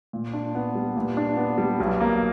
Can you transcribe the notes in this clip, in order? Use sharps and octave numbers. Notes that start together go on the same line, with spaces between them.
A#2
D4
B3
G3
A#2
D4
B3
G3
B1
A#3